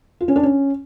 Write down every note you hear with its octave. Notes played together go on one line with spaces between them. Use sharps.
F4
C#4
D4
C#4